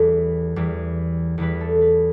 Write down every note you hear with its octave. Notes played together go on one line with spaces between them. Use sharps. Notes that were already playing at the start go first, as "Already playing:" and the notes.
Already playing: E2 E3 G3 A4 B4
E2 E3 G3
E2 E3 G3 B4
A4
B4